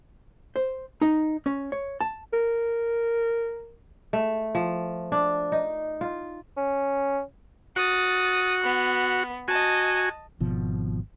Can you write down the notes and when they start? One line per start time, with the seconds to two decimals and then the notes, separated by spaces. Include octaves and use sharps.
0.56 C5
1.01 D#4
1.46 C#4
1.72 C#5
2.01 A5
2.33 A#4
4.13 A3
4.55 F3
5.12 D4
5.52 D#4
6.01 F4
6.57 C#4
7.76 F#4 F#5 D#6 A6
8.64 B3
9.48 F#4 D#5 G#5 A5
10.40 G#1 B2 F3